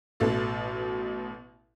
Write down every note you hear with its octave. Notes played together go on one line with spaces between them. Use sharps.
A1 B2 A4